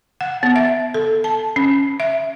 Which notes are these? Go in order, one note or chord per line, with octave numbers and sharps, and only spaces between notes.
F#5
B3
E5
A4
A5
C#4
E5